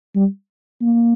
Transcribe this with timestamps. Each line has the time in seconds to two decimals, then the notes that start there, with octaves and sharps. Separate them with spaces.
0.16 G3
0.82 A#3